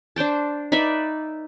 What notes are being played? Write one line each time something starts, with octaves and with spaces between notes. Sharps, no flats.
D4 C5 G5 A5
D#4 B4 D5 E5